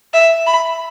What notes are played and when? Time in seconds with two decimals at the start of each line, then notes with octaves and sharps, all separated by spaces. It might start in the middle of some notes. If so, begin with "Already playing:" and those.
0.14 E5
0.47 B5